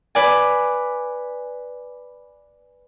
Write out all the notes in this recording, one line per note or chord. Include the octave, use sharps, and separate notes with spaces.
B4 D5 G#5